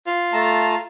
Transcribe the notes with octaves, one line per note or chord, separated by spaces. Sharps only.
F4
A3 A5 A#5